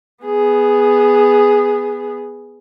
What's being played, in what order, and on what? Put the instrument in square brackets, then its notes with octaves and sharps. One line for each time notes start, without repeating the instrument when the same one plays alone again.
[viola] B3 G#4